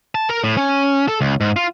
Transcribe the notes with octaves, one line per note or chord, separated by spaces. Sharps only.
A5
A#4
A2
C#4
A4
C#2
G#2
F4